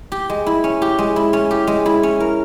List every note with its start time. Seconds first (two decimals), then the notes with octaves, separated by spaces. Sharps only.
0.12 G4
0.30 G#3
0.46 E4
0.64 C#4
0.82 G4
0.99 G#3
1.16 E4
1.33 C#4
1.51 G4
1.67 G#3
1.86 E4
2.03 C#4
2.20 A#4